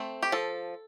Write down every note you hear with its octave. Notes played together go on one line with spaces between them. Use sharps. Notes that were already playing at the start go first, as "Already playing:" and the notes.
Already playing: A3 C4
G4
F3 A4